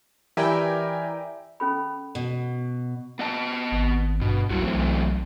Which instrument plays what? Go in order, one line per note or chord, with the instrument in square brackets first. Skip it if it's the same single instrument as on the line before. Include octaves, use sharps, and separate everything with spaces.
[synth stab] E3 E4 G5 [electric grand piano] G4 A#4 G#5 [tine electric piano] D5 E5
[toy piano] C#4 A4 B5
[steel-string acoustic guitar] B2
[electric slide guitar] B3 D#5 A5
[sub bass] G#1
[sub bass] G2 [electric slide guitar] B2
[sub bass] C2 [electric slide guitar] F#3 E4 F#4
[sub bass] B1 [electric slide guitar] E3 A3 C4